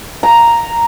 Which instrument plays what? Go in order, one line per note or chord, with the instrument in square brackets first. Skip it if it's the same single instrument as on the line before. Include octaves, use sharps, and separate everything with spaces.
[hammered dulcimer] A#5